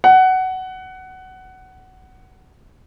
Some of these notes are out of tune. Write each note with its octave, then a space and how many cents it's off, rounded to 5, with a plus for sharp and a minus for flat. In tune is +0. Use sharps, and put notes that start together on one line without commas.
F#5 +15